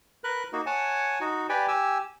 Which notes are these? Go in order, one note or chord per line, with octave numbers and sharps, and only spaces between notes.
A#4 B4 F#6
A#3 D#4 F#4
C#5 F#5 G#5 A5
D#4 F#4
G4 B4 D5 G5 G#5
G4 G#5 E6